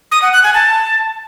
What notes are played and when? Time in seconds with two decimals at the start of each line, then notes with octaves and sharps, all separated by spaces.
0.12 D#6
0.22 F#5
0.33 F#6
0.43 G#5
0.54 A5